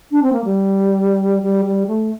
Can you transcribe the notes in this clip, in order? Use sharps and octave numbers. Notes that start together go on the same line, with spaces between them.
D4
C4
A#3
G3
G3
G3
A3